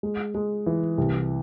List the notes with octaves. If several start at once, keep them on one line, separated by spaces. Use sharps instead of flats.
G#3
G#3
E3
C2